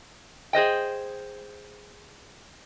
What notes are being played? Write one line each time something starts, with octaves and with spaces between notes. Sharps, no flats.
G#4 C5 D#5 G5